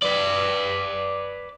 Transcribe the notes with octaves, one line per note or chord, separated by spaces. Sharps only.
B4 D5